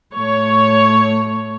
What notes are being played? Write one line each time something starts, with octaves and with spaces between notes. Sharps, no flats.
A2 A3 C#5